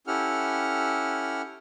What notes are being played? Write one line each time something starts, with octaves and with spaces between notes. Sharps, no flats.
C#4 E4 G4 A4 F#5 F6